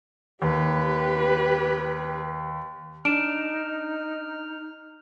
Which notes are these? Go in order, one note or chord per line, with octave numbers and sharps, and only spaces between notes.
D#2 G4 B4
D4 D#4 F6 D7 E7